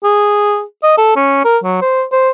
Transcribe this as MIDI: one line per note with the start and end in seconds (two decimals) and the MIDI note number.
0.04 0.62 68
0.83 0.95 75
0.98 1.16 69
1.16 1.41 61
1.45 1.58 70
1.64 1.79 54
1.82 2.04 72
2.12 2.30 72